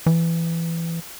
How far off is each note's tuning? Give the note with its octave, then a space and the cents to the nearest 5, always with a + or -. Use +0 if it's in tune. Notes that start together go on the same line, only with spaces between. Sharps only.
E3 +15